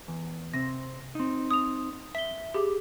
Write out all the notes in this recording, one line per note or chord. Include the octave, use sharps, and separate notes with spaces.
E2
C3 C4 A#6
C4 D#4
D#6 F7
E5 B6 G7
G4 G#4 D6